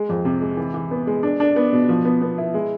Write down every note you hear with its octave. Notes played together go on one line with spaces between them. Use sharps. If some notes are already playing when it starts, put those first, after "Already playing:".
Already playing: G#3
F2
C3
G#3
E3
E3
B3
G#3
D4
D4
B3
B2
F3
B3
B3
E4
G#3